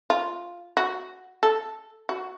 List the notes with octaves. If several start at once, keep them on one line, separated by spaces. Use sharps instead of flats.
F4
F#4
A4
F#4